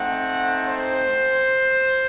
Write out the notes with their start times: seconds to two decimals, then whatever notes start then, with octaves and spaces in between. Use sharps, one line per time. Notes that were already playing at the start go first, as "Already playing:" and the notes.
Already playing: A3 C4 D#4 F#5
0.68 C5